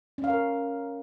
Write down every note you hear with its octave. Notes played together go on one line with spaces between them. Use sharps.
C#4
F5
A#4